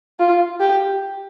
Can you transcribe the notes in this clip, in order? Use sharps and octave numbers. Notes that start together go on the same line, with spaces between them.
F4
G4